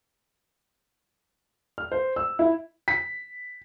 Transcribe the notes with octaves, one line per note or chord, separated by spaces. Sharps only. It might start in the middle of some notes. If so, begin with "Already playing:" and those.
F6
C5
E6
E4
B6